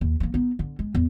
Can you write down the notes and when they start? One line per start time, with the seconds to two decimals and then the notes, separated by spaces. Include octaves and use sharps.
0.01 D#2
0.20 D#3 A#3
0.34 B3 D#4
0.59 D3
0.79 G#3
0.95 E2